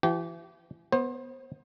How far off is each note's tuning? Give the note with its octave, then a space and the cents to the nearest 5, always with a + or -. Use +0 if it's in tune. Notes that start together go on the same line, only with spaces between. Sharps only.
E3 +35 G4 -35
B3 +0 C5 +25